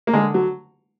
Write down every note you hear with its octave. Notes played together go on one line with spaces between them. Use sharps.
A#3
D3 G#3
F#3